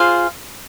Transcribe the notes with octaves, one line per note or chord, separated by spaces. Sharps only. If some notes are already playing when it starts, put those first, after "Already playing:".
Already playing: F4 G#4 C5 F5